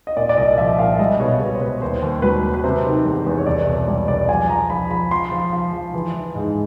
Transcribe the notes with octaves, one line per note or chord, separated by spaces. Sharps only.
D#5
A#2 D5
D5
C2 D#5
F3 E5
A#2 F5
E5
G3 D#5
B2 C#5
B2 C#5
C5
G3 B4
C#5
D#2 C5
D#2
F#3 B4
D#2
B4
C3 C5
D#3
E2
E2
C#5
C2 D5
B2 C#5
G3 D5
C2 D5
F3 G#5
F3 A#5
F3 B5
F3 B5
F3 C6
F3
F3
F3
E3
E3
G#2